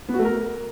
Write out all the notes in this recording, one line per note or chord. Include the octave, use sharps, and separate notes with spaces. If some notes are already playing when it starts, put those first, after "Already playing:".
B3
F#4
A3
A#4